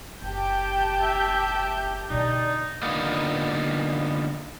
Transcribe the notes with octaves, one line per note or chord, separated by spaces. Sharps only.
F#1 G4 G5 A5 G6
E5
B2 D3 D#4 D5
D3 A#3 B3 D#4 F4